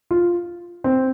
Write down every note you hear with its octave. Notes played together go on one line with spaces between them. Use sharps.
F4
C4